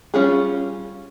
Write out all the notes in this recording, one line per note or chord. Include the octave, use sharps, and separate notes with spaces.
G3 C#4 F4 G#4